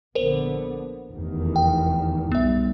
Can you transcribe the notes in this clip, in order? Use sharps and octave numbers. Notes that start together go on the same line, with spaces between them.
A#1 D3 B3 A#4 C5
F1 E2 D#3
G5
B1 G3 B3 E5